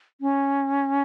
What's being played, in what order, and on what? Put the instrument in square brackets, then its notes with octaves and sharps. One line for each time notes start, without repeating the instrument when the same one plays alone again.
[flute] C#4